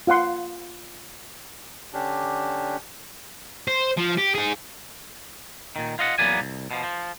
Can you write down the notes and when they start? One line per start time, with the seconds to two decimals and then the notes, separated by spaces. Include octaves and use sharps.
0.07 F4 F5 F#5 C6
1.93 D3 C#4 D4 G4
3.68 C5
3.97 F3
4.18 G4
4.35 D#4 G#4
5.76 A#2 D#3
5.99 F4 D#5 F#5
6.18 E2 F#3 A#3 B3 D5 G#5
6.41 C2
6.71 B2 F3
6.84 F3